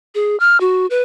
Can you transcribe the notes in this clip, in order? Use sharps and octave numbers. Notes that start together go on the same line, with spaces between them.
G#4
F6
F#4
B4